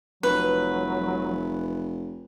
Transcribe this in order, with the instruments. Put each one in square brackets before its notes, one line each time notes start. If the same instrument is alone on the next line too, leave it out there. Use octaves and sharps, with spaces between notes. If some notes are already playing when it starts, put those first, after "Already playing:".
[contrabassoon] F1 [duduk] F#3 [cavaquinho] B4